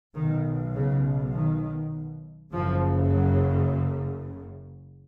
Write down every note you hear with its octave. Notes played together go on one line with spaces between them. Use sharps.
B1 B2 D#3
C#3
D#3
F#1 F#2 C#3 F3
F#3